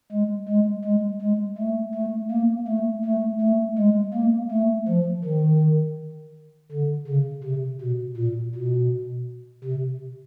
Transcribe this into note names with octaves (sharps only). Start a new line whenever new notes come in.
G#3
G#3
G#3
G#3
A3
A3
A#3
A3
A3
A3
G#3
A#3
A3
F3
D#3
D3
C#3
C3
B2
A#2
B2
C3